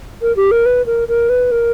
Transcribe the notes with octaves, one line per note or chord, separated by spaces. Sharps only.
A#4
G4
A#4
B4
A#4
A#4
B4
A#4